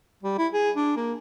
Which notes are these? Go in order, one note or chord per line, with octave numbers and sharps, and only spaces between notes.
G3
E4
G#4
D4
A#3